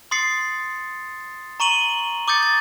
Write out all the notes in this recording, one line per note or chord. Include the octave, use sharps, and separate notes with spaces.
C6 D#6 A6 C7 C#7
A#5 C#6 D#7 F#7 G7
D6 D#6 G6 A6 C#7
A6